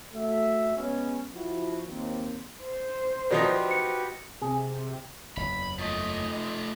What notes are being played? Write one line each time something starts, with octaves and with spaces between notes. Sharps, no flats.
A3 F#4 E5
G#3 B3 C#4
F3 E4 F#4
D#2 A#3 C4
C5
D#3 F3 D#4 F#4 G4 B4 D5
C#7
C3 G#4
F#1 E2 B5
F3 A3 D#5